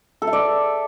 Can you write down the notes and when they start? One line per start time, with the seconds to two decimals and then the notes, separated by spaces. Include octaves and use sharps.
0.22 A4
0.27 E5
0.33 D5